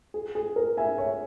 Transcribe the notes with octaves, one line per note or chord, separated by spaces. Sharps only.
G#4
G#4
A#4
E5 G#5
C#5 E5